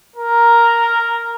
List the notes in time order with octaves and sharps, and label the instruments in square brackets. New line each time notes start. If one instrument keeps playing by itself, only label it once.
[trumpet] A#4